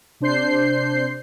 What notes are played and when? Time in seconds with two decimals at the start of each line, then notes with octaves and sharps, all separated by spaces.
0.20 C3 D4 C5 G6 C7